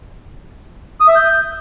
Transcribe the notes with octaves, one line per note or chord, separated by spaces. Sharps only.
D#6
E5
G6